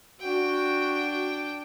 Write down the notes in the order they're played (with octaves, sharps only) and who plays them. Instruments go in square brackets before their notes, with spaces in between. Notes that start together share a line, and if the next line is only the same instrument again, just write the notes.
[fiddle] D4 G5 [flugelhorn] F#4